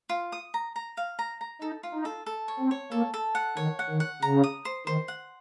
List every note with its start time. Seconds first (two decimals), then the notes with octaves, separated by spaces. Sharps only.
0.09 F4
0.32 D#6
0.54 A#5
0.76 A#5
0.97 F5
1.19 A#5
1.41 A#5
1.62 D#4 A4
1.83 F4
1.94 D#4
2.05 A4
2.26 A4
2.48 C#5
2.60 C4
2.71 C#5
2.92 A#3 A4
3.14 A4
3.35 F#5
3.57 D#3 C#5
3.79 F#5
3.90 D#3
4.00 F#5
4.22 C#3 A#5
4.44 D#6
4.65 C5
4.87 D#3 C5
5.08 F#5